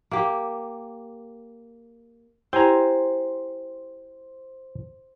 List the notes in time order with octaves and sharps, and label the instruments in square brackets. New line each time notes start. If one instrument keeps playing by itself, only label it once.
[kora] A#3 G4
[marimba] E4 G4 [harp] C5 [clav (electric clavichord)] G5 G#5 A#5